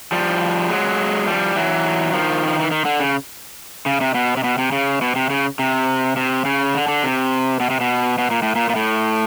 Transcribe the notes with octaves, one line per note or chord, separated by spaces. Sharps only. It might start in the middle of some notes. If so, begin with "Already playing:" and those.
F3 G3
F#3 G#3
F3 G3
E3 F#3
D#3 F3
F3
E3
D#3
D3
C#3
C#3
C3
B2
C3
B2
C3
C#3
B2
C3
C#3
C3
C3
C#3
D3
D3
C3
B2
C3
B2
B2
A#2
A2
A#2
A#2
A2